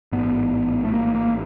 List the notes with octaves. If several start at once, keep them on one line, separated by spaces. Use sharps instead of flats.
A1 G#2 B3
A3
A#3
A#3